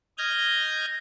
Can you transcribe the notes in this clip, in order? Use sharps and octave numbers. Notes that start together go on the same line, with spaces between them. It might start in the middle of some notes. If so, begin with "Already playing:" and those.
D#5 F6 G6 G#6 A#6